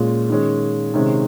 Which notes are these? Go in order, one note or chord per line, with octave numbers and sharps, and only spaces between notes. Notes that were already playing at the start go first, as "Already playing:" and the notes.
Already playing: A#2 G#3 C#4 F4
D#3 G#3 C#4
C3 D#3 G#3 C#4